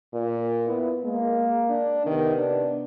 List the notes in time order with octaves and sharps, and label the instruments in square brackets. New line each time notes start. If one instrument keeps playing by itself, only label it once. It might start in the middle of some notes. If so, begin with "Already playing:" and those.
[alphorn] A#2
[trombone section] B3 E4
[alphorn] G#3 [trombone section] A#3
[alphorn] D4
[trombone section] C3 B3 [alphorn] D#3
[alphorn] D4